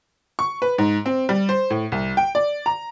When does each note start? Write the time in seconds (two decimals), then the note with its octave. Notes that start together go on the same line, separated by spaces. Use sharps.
0.39 C#6
0.62 B4
0.78 G#2
1.06 C4
1.29 G3
1.49 C5
1.70 A2
1.92 C2
2.17 G5
2.35 D5
2.66 A#5